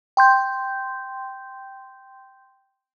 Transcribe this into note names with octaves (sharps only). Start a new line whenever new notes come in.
G5 C6 G6